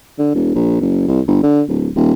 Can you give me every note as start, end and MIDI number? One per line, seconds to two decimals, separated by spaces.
0.19 0.31 50
0.34 0.53 28
0.55 0.80 34
0.81 1.07 30
1.08 1.21 36
1.27 1.40 31
1.43 1.61 50
1.69 1.89 26
1.95 2.13 27